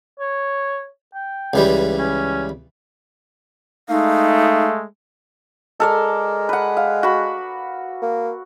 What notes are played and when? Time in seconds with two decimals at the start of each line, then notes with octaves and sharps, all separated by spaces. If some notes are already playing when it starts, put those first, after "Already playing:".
0.20 C#5
1.14 G5
1.54 C#2 E3 G3
1.98 C#4
3.89 G#3 A3 D#4 F5
5.80 G#3 A4 A#4 D5
6.49 B4 F#5
6.77 F5
7.03 F#4 B5
8.02 A#3